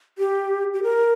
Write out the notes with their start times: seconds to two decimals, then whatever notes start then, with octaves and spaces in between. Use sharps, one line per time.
0.18 G4
0.74 G4
0.83 A#4